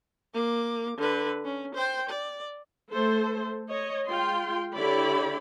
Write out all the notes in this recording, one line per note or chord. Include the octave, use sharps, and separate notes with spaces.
A#3 D6
D3 B4
C#4
C5 G5
D5
A3 A4 C5
C#5 D#5
G#3 F4 G5 C6
D3 E4 G4 C#5 D5 B5